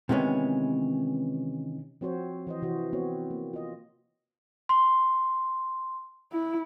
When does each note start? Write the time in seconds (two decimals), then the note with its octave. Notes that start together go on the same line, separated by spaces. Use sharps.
0.09 C3 D#3 E3 G#3 B3 C#4
2.01 F3 C4 F#4 C5 C#5
2.47 E3 C5 D#5
2.62 C3 E3 F#4 C5
2.93 B3 C4 F#4 C#5
3.31 A#3
3.54 F4 D#5
4.69 C6
6.32 E4